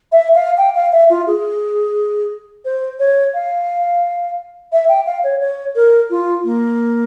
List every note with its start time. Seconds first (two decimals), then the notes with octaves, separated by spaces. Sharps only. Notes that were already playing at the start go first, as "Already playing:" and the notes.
0.12 E5
0.35 F5
0.58 G5
0.75 F5
0.92 E5
1.10 F4
1.27 G#4
2.65 C5
2.99 C#5
3.34 F5
4.72 E5
4.88 G5
5.06 F5
5.24 C#5
5.40 C#5
5.75 A#4
6.10 F4
6.44 A#3